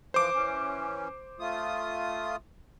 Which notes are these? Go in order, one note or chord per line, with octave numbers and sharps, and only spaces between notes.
E3 F3 C5 D6
E3 C#4
A3 F4 D#6